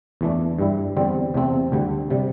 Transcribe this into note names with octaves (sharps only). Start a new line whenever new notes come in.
E2 E3 A3 D4
G2 G3 E4
E2 D3 G3 C4
E2 C3 A3 C4
D2 D3 G3
C3 G3